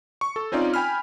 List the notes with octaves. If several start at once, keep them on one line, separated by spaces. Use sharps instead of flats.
C#6
A4
C4 C#4 D#4 F4 D5
G5 G#5 B5 F6